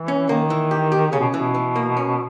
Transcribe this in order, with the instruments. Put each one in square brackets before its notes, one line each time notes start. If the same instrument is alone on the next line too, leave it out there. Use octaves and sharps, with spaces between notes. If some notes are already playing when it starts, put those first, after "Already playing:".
Already playing: [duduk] E3
[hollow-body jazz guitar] C#4
[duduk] D#3 [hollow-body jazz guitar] A#3
[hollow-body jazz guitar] E3
G4
G4
[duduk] C#3 [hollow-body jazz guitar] C#4
[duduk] B2
[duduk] B2 [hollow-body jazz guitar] E3
[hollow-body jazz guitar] E3
A#3
C#4